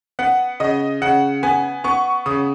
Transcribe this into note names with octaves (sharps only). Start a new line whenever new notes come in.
B3 F#5
C#3 D#5
C#3 F#5
B3 G#5
B3 C#6
C#3 D#6